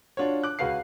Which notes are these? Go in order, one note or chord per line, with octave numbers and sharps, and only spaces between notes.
D4 F4 F#4 C#5
D6 F#6
C#2 F#4 B4 F5 C7